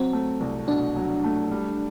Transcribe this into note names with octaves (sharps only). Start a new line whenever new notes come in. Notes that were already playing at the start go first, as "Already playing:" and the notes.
Already playing: F#3 C4
A3
C2
B2 D4
F#3
A3
G3